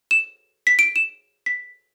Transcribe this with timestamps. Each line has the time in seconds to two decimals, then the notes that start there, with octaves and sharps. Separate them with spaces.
0.11 E7
0.67 B6
0.79 D7
0.96 E7
1.46 B6